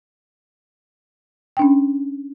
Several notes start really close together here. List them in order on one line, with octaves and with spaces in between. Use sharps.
G5 D4 C#4